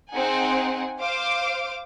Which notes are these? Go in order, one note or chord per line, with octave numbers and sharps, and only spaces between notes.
C4 D#4 G#4 F#5 G#5
C5 F5 D6